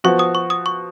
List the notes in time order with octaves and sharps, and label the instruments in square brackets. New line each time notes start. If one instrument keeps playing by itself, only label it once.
[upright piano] F3 B3 F#4 [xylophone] C#6
[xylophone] D#6
C#6
D#6
C#6